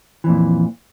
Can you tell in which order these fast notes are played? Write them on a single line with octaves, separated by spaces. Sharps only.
E3 F2 A#2